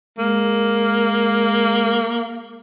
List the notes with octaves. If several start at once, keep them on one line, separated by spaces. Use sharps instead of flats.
G#3 A#3